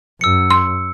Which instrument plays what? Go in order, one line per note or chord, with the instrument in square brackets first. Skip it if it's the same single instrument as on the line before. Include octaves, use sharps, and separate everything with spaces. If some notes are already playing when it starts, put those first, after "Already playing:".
[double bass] F#2 [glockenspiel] E6 C#7
[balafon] C6